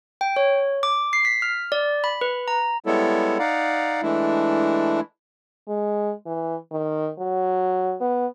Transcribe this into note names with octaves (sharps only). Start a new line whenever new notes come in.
G5
C#5
D6
C7
B6
F6
D5
B5
B4
A#5
G3 G#3 B3 E4 A4 C#5
D#4 D5 F5 F#5 A#5
E3 G#3 A3 D4 E4
G#3
E3
D#3
F#3
B3